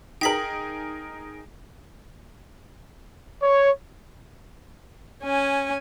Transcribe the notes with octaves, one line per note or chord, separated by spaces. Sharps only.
D#4 G#4 A#4 G5 B6 F#7
C#5
C#4 G#5